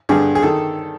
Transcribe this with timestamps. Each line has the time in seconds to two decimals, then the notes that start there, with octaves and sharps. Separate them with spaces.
0.09 G2 D3 G#4
0.35 G#4
0.43 D#3 A4